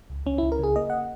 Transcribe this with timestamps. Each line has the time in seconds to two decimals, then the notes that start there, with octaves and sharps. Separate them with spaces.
0.10 C#2
0.26 C#2 C#4
0.38 C#2 E4
0.52 A#4
0.59 C#3 G#4
0.76 A#3 D#5
0.90 F#5